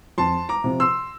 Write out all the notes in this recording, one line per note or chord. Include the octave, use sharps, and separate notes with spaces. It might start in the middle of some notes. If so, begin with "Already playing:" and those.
F2 A5 C6
A#5 D6
C3 F3
C6 E6